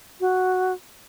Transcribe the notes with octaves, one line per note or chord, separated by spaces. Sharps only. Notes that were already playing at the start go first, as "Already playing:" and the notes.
F#4